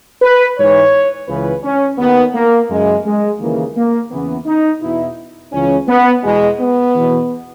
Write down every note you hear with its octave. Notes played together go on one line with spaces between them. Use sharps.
B4
G#2 E3 C#5
C#2 C#3 E3 B4
C#4
D#2 D#3 B3
A#3
F#2 C#3 E3 G#3
G#3
D#2 C#3 E3 A#3
A#3
E2 C#3 E3 B3
D#4
E2 B2 E4
C#2 C#3 E3 C#4
B3
E2 B2 G#3
B3
E2 B2